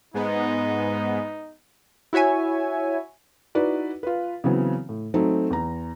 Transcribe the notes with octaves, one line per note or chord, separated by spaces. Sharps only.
G#2 G#3 B3 D#4
E4 F#4 C#5 E5 G#5
D#4 E4 F#4 B4 D5
F4 B4
C#3 E3 F#3 B3 C4
A2
F#3 A3 C4 D#4
E2 A#5